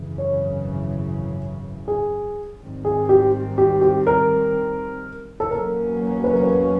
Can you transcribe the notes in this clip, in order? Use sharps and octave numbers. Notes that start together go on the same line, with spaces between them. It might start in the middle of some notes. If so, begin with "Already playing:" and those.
Already playing: G#1 F#2 C#3 E3
C#5
G#4
G#2 D#3 G3 C4
G#4
G4
G4
G4
A#4
A4
E2 B2 F#3 A#3 C#4 A#4
B4
A#4
B4